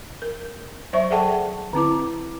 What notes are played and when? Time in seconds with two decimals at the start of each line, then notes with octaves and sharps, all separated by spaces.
0.22 A#4
0.93 F#3 C5 D5 E5 C#6
1.11 G#4 A4 D5 F#5 G5 A5
1.73 D3 C4 E4 D6